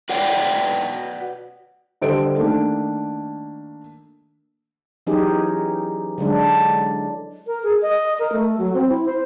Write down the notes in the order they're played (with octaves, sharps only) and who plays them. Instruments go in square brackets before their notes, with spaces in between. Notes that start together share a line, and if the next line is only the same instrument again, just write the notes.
[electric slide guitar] F#4 B4 C#5 D5 F#5 G5
[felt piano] D3 G3 A4 C5 D#5 D7
D#3 A3 A#3 D4
[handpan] E3 F#3 C#4 D#4 G4 G#4
D3 F#3 G#3 D4
[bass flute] A#4
G#4
D#5
A#4
A3
F#3
C4
E4
C5